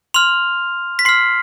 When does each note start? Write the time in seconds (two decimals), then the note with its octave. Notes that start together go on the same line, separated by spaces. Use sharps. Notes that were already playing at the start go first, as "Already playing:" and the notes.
0.14 C6 F6 F7
0.99 B6
1.05 C6 F6 C7